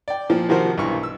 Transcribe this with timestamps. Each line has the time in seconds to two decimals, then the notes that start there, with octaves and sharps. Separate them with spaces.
0.08 D5 G5
0.30 A#2 F3
0.49 C3 D#3 F3 F#4 A#4 C5
0.77 B1 G2 E3 C#6
1.03 E6